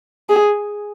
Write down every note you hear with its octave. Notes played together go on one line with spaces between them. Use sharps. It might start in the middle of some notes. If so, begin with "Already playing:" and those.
G#4